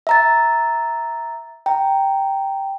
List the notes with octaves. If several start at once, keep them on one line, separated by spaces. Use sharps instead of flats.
E5 A#5 A6
G5 A#5